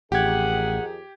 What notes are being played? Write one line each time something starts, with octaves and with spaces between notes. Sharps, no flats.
A1 F2 D#3 G4 G#4 F#5 G#6